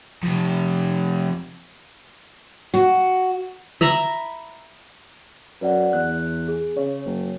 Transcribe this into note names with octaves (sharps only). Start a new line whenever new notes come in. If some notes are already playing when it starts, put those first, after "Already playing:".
F2 C3
F#4
E5 A#5 B5
F#2 B4 D5 F#5
E2 F#6
G#4
C#3 C#5
F#1